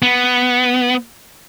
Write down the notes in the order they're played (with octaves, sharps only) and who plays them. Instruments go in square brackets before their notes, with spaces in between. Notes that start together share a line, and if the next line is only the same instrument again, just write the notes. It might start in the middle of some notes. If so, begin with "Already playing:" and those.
[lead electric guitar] B3